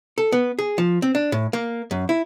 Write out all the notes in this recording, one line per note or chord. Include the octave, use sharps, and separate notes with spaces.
A4
B3
G#4
F3
C4
D4
A2
A#3
F#2
E4